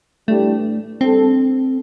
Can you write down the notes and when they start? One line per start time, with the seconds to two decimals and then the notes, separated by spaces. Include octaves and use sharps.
0.28 A2 E3 G3 A3 D4 G4
1.01 G3 C4 D4 A4